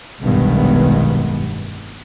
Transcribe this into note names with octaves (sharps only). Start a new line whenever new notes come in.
F1 B1 G2 D#3 G#3 B3